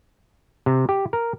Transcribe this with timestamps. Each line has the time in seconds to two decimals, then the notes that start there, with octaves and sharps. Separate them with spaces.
0.66 C3
0.89 G4
1.13 A#4